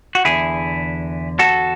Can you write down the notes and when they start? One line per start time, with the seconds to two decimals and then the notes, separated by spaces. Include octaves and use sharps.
0.15 F#4
0.25 E2 D3 E4 G#4
1.39 F#4 A4